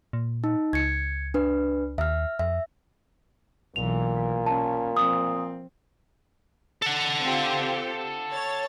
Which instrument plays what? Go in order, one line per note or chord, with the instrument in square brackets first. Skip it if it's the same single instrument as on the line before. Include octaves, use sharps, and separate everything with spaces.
[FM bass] A#2
[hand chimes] D#4
[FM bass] C#2 [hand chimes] G#6 C#7
[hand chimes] D4 B4
[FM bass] D#2 [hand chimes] E5 F6
[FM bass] F2 [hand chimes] E5
[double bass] B1 E3 [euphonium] A#2 [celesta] F7
[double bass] C#4 [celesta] A5
[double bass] F3 C4 [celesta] D#6
[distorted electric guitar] A4 F#5
[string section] C4 F4 G4
C#5 A6